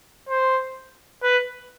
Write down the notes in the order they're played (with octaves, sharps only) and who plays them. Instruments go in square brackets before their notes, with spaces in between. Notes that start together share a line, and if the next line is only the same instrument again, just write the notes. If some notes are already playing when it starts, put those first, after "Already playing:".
[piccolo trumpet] C5
B4